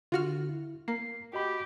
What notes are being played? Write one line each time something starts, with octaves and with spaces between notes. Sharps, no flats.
D3 F4 F#4 F6
E4
A#3 C7
F#4 G4 D#5 B5